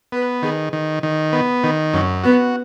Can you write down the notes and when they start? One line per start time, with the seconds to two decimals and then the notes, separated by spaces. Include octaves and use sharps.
0.12 B3 B4
0.42 D#3 G#4
0.73 D#3
1.03 D#3
1.33 B3
1.64 D#3
1.93 F#2 C#4
2.23 B3 F#4